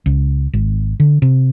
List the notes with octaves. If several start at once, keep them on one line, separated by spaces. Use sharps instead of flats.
C#2
G#1
D3
C3